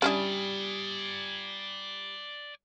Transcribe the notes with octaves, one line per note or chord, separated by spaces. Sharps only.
G3 C#4 D4 E4 D5 G#5 D#6